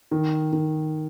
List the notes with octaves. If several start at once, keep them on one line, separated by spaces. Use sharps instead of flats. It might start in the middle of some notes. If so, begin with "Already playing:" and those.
D#3
D#3